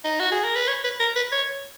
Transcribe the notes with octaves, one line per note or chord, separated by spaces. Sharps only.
D#4
F#4
G#4
A#4
B4
C#5
B4
A#4
B4
C#5